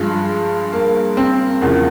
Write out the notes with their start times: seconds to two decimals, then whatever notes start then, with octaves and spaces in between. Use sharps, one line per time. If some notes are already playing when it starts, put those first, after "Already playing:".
Already playing: G2 F3 G#3
0.73 A#3
1.17 C4
1.61 E2 C#3 F3 A#3